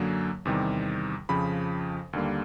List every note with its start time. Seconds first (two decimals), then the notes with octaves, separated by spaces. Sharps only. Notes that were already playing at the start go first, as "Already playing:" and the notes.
Already playing: F#2 D3 F#3 A#3
0.45 E2 C3 D#3 G3
1.29 F2 C#3 F3 B5
2.13 D#2 D3 G3 A#3